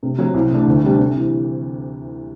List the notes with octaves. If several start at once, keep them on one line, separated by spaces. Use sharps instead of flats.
C3
F#3 C4
C2
C3 E3 A3 D4
D2
C3 G3 D4 G4
C3
E3